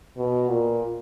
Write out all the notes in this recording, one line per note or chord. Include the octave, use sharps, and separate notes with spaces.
B2
A#2